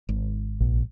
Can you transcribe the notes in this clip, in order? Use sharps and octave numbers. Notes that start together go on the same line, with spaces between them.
G#1
A#1